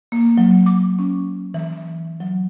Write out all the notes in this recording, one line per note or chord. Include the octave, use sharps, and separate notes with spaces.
A#3
F#3
D6
C#4
E3
F#3